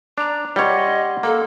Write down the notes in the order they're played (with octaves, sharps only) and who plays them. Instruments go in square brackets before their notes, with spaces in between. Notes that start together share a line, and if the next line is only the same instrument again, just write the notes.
[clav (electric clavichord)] D4 [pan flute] A#5
[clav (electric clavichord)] G3 C#5 [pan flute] D#5 [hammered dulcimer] F#5 C6
[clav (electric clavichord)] A#3 [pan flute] A4